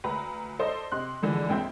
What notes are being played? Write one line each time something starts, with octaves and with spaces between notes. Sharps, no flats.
D2 B4 A#5
A4 C5 D5 D#5
C3 D#5 C6 F#6
D3 E3 F3 G#3
A#1 F2 C4 E5 G5